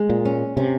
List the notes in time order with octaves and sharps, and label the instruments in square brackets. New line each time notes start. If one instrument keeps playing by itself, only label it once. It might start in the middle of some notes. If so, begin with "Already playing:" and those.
Already playing: [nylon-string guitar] G#3
[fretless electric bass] A#2
[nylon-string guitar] C#4
[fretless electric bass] C3 [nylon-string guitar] C#4